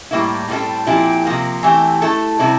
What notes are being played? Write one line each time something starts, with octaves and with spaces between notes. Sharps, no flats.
A2 G3 A#3 E4
A2 G3 C4 E4 A4
A#2 F3 C4 E4 G4
C3 F3 A#3
E3 A3 C4 G4
A3 E4 A4
C3 G3 C4 E4